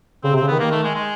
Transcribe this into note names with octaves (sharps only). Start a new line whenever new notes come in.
C#3 C4
C3
C4
C#3
D#3 B3
D#3 A#3
A3
G#3
G#3